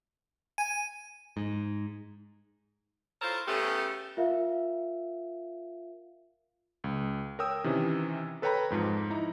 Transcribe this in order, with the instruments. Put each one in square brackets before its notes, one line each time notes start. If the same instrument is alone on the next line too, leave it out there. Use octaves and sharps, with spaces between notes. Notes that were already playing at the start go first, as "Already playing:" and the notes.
[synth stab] G#5 [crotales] D#7
[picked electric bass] G#2
[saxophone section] E4 F4 A4 A#4 C5 C#5
A2 C#3 A3 B3 C#4 G4
[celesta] F4 A#4 E5 F5
[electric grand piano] C#2
A#4 C#5 G5 D#6 E6
C3 D#3 E3 C#4
A4 B4 C#5 G5 A#5 B5
F2 G#2 F3
D#4 E4 A#5